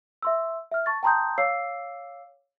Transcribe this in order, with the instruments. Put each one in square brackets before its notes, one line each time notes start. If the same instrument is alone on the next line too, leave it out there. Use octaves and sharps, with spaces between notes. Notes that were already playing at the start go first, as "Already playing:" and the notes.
[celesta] E5 C6 E6
E5 F6
A5 C#6 A6
G5 A5 A#5 C6 D#6 G6
C#5 F5 D6 E6 C7